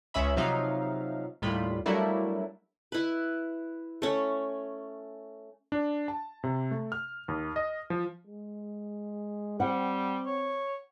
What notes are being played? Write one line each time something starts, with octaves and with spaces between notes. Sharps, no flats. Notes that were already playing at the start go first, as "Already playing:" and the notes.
C#2 C#3 C#4 E5 B5
C3 F3 F#3 D#4 E5 F5
D#2 A2 G3 F4 B5
F#3 G3 A3 A#3 D4 E4
E4 B4
A3 C#4
D4
A5
C3
A3
F6
D#2
D#5
F3
G#3
G3 C4 F#5
C#5